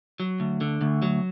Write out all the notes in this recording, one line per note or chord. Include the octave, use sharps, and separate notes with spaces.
F#3
D2
D3
D2
F#3